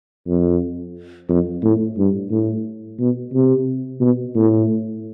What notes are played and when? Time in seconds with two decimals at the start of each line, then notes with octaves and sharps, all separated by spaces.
0.27 F2
1.29 F2
1.63 A2
1.97 G2
2.30 A2
2.99 B2
3.33 C3
4.00 B2
4.35 A2